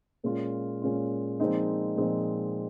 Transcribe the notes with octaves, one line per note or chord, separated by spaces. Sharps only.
A#2 G#3 C#4 F4
A#2 G#3 C#4 F4
A#2 F3 G#3 C4 D#4
A#2 F3 G#3 C4 D#4